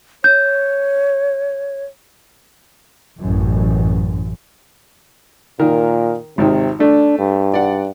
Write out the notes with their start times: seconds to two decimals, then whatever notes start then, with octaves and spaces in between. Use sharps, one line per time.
0.24 C#5 G6
3.19 A1 F#2
5.60 A#2 D#3 A#4
6.38 G#1 C3 D#3
6.80 A3 D4
7.19 G2
7.54 D5 F#5